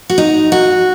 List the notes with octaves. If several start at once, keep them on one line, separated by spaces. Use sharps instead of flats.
F#4
D#4
F#4